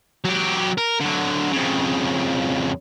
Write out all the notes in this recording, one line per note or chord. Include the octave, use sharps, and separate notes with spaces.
F#3 G4
A#4
D3 F#3
F2 C#3